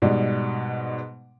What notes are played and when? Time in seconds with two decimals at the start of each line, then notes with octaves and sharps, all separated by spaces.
0.02 G#2 B2 G3